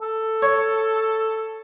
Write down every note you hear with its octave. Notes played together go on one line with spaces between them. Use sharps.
A4
C#5